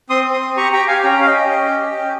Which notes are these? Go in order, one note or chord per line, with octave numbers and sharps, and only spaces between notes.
C4 C6 D#6
C4
C6 D#6
C4
G4 A#5 C#6
G4 G5 A#5
G4 F5 G#5
C#4 G5 A#5
C#4 F5
D#5 G5
G4
C#4
G4
G4
C#4